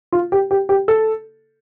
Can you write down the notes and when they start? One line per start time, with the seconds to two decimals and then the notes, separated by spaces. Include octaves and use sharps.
0.13 F4
0.32 G4
0.51 G4
0.69 G4
0.88 A4